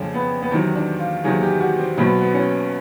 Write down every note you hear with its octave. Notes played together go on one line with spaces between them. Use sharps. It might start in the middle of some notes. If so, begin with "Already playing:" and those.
Already playing: F2 C#3 F3 C#4 D4
B3
B3
E2 C3 D#3 F#3 C4
D4
F4
E2 C3 D#3 F#3 G#4
G4
F#4
C4
B1 B2 F#3 C4
B3
B3
C#4